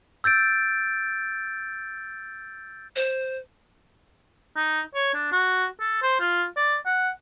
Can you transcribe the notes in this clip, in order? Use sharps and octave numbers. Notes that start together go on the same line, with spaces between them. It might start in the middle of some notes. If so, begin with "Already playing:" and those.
E6 G6 A6 D7
C5
D#4
C#5
D4
F#4
A4
C5
F4
D5
F#5